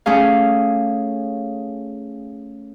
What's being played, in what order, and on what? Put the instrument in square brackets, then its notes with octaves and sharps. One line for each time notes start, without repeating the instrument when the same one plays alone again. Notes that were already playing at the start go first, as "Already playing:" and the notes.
[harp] A3 C#4 G#4 F5